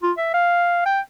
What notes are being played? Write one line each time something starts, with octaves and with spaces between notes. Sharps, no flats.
F4
E5
F5
G5